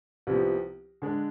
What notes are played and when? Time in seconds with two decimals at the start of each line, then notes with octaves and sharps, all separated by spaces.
0.27 C2 C3 F3 B3
1.02 D3 G#3 D4